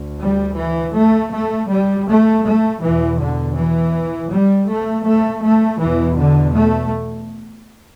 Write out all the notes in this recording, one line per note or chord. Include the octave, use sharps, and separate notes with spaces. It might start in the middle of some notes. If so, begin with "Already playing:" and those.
Already playing: D2
G3
E3
A3
A3
G3
A3
A3
E2 B2 E3
D3
E3
G3
A3
A3
A3
E2 B2 E3
D3
A3